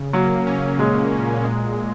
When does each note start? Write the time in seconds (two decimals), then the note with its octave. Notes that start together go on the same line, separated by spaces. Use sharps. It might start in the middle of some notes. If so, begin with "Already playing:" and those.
Already playing: C#3
0.13 F#3 A#3
0.47 C#4
0.78 A#2 G#3
1.12 A#2
1.44 G#3